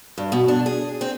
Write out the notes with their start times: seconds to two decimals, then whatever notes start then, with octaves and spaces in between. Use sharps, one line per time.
0.18 G2
0.32 B2
0.48 D4
0.66 G#4
1.01 C4